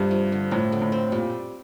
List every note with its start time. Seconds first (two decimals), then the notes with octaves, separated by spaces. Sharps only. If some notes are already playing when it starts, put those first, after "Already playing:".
Already playing: G2 C3 A3 F4
0.11 F3
0.32 D3
0.51 A2 F3
0.72 D3
0.82 A2
0.92 C4
1.12 A#2 G3